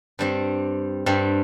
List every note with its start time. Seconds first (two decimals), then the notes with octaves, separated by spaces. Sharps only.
0.19 G2 G3 C4
1.06 G2 G3 C4